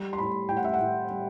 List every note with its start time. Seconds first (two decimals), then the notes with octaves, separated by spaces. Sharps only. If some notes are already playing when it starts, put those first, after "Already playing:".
Already playing: G3
0.13 C6
0.18 A2 B5
0.49 A2 G5
0.57 F#5
0.64 E5
0.73 F#5
0.79 A2
1.11 G3